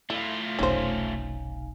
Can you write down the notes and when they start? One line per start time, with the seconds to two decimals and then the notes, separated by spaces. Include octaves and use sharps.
0.10 A3 E4 F4
0.59 F1 B1 C#4 D#4 C5 F5 G#5